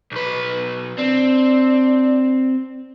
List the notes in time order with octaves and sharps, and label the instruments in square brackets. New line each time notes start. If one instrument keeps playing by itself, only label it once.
[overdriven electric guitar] B1 B4
[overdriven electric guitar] C4 [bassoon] D4